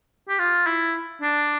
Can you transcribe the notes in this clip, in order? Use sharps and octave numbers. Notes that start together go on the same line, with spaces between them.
G4
F4
E4
D4